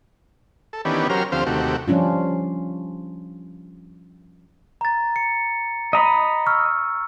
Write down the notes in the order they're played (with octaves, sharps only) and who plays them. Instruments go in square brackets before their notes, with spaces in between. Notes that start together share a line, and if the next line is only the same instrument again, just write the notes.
[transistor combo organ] A4
D#3 E3 B3 C#4 D4 G4
F#3 C#4 G4 A#4 C5 F6
D2 F3 C4 G4 C5 F5
D#2 C3 A3 F#4 G4
[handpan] F3 G3 C#4 D4 F4
[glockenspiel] A#5 A6
C#7
[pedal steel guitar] D#5 A#5 B5
[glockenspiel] C#6 E6 F6